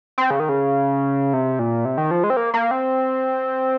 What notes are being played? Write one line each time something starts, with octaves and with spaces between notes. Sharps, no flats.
C4
C#3
D#3
C#3
C3
A#2
C3
D#3
F3
G#3
C4
A#3
A#3
C4